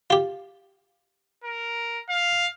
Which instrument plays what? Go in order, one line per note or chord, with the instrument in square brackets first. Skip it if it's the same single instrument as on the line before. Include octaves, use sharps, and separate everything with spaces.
[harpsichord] F4 G4
[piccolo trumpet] A#4
F5